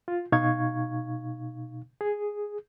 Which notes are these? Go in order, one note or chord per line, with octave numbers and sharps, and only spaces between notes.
F4
B2 D#4 F5 C#6 G#6
G#4